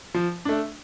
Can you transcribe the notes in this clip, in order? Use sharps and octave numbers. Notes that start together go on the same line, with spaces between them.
F3
A3 D4